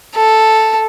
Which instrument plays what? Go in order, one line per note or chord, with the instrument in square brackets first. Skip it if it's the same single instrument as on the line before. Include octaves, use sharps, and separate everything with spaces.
[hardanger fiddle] A4